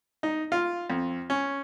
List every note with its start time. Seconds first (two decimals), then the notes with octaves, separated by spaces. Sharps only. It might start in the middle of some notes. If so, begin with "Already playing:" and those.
0.23 D#4
0.52 F4
0.90 F2
1.30 C#4